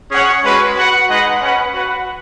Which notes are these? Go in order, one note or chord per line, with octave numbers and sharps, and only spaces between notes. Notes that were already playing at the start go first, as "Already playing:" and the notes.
C#4 G#4 C#5 F#5
G#3 C#4 F#4 B4
F#4 B4 F#5
G#3 D#4 B4 D#5 F#5
C#4 B4 F#5
F#4 B4 F#5